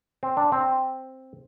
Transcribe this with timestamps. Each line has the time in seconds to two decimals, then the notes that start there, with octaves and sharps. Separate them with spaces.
0.23 C4
0.37 D4
0.52 C4